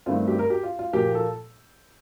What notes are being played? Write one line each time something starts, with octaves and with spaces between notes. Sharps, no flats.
G2 D#3 A3 C4 F4
G4
A#4
G4
F4
F4
A#2 F3 A#3 G4
A4